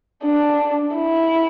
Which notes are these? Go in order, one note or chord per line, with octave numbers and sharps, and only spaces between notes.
D4
E4